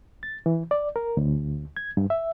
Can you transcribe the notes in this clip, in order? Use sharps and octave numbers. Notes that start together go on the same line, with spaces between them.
A6
E3
D5
A#4
D2
G#6
G2
E5